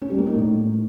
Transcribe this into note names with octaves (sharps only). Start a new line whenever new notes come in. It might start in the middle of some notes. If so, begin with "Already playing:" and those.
C#4
G3
A#3
D#4
A2